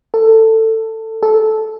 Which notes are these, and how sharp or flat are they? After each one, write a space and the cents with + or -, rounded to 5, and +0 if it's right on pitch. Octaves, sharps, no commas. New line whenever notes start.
A4 +15
A4 -10